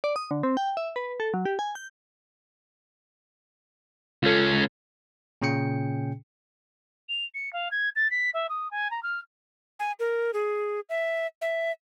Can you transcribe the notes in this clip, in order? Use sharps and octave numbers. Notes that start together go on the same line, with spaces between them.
D5
D#6
D3
C4
G5
E5
B4
A4
F#3
G4
G#5
G6
C#2 C#4 F4 A4
A#2 C#3 C#4 G#4 G5 C#7
F7
C#7
F5
G#6
A6
B6
E5
D#6
G#5
A#5
F6
G#5
A#4
G#4
E5
E5